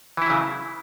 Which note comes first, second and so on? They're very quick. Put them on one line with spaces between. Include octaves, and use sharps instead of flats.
E3 E4 F#3 C#3